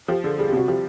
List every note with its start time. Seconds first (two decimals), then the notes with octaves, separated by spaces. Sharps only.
0.08 F3 G4
0.24 D3 G#4
0.38 G3 G#4
0.48 G4
0.53 C3 F#4
0.67 F3 G4